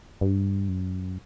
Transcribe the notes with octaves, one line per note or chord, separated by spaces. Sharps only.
G2
F#2